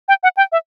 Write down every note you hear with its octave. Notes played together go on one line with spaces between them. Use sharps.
G5
F#5
G5
E5